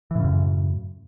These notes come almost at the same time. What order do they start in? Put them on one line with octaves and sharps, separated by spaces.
E3 A2 C#3 F#2